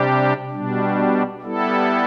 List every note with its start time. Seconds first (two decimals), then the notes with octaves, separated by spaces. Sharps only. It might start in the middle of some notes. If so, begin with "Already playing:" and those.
Already playing: C3 G3 D4 G4
0.51 B2 G3 D4
1.42 G3 B3 E4 A4